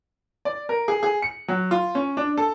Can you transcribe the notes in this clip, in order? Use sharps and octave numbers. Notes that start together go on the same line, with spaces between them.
D5
A#4
G#4
G#4
C#7
F#3
F4
C#4
D4
A4